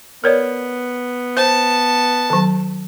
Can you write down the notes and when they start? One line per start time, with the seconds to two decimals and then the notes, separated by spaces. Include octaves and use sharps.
0.24 B3 A#4 C#5 D5
1.37 C5 A5
2.30 D#3 F#3